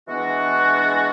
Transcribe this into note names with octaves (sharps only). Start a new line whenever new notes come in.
E3 G#3 B3 D4 F#4